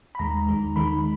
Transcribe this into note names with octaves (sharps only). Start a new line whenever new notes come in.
B5
D#2 D#3 G#3 A#5
D#2 D#3 G#3
D#2 D#3 G#3 B5